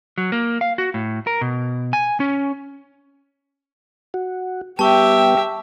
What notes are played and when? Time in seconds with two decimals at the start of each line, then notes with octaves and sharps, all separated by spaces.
0.18 F#3
0.32 A#3
0.61 F5
0.78 F#4
0.94 A2
1.27 A#4
1.41 B2
1.93 G#5
2.20 C#4
4.14 F#4
4.79 G3 B3 G4 E5 G5 A5 C#6